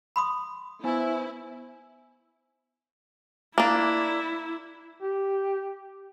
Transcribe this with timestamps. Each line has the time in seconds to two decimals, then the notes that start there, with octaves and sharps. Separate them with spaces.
0.16 B5 C6 D#6
0.84 B3 E4 C5 G#5
3.58 A#3 D4 E4
5.02 G4